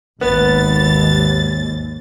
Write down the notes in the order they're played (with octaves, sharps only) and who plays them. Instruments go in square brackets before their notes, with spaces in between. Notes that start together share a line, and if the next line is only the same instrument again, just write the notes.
[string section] G#1 A6 [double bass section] D#2 [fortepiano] B3